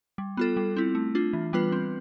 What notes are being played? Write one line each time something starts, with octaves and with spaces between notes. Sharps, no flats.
G3
B3 F4 A4
G3
C4 E4
A3
D4 F4
E3
G3 B3 F4 B4
C4